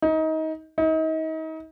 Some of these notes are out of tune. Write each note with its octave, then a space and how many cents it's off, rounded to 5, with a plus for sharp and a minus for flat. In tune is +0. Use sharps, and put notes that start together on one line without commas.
D#4 +25
D#4 +35